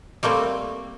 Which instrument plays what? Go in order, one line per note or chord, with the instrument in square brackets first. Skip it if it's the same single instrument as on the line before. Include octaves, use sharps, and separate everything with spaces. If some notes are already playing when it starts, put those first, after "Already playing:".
[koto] G3 A3 A#3 C4